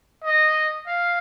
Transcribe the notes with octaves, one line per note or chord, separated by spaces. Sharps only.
D#5
F5